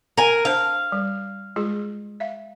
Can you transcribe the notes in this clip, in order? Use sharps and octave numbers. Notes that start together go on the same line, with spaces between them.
A#4 G#5
D4 C5 F5 A5
G3
G#3 F4 G#4
E5 F5